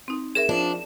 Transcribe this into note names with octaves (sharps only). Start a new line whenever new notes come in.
C4 D#4
G#4 A#4 E5 E7
F3 D4